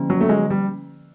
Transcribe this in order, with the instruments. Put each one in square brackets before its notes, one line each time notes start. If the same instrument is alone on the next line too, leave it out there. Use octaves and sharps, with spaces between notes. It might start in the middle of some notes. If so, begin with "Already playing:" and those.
Already playing: [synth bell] D3 F3 A#3 C#4
[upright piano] F#3
A3
F#3 G#3
G3